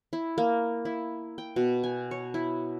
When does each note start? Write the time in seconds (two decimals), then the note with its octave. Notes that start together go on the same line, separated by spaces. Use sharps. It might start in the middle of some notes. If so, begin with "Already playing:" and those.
0.13 E4
0.38 A#3
0.85 E4
1.38 G5
1.56 B2
1.84 G#5
2.11 C#5
2.34 E4